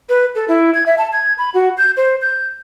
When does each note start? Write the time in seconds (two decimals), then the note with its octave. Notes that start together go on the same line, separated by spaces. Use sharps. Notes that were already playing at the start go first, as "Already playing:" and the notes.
0.09 B4
0.35 A4
0.48 E4
0.74 G#6
0.86 E5
0.98 A5
1.13 G#6
1.38 B5
1.54 F#4
1.78 G6
1.97 C5
2.22 G6